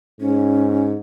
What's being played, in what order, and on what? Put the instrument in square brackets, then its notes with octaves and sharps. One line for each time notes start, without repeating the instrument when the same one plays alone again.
[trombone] G#2 [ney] C#4